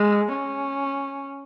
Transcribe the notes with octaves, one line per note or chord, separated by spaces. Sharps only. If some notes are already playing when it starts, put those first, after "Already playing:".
Already playing: G#3
C#4